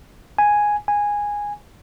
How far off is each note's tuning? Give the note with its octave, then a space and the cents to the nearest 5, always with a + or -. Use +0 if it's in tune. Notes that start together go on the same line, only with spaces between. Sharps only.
G#5 +0
G#5 -10